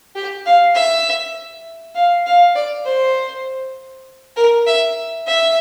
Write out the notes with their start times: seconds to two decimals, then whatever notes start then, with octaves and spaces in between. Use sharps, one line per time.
0.16 G4
0.46 F5
0.75 E5
1.95 F5
2.26 F5
2.55 D5
2.85 C5
4.36 A#4
4.67 E5
5.27 E5